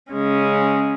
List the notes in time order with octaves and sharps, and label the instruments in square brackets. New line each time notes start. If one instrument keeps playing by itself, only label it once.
[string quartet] C#3 G#3 C#4